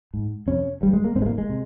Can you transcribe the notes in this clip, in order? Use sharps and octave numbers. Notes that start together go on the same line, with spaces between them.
G#2
F2 C3 C#4
G2 G3
G#3
A#3
G#2 C4
G#3
A#3
G#3
C3